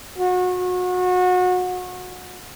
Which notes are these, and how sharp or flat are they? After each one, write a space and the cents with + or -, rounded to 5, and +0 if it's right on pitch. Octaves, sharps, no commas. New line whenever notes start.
F#4 -30